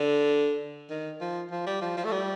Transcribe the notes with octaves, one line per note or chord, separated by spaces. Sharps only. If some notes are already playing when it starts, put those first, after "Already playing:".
Already playing: D3
D#3
F3
F3
G3
F3
F3
A3
G3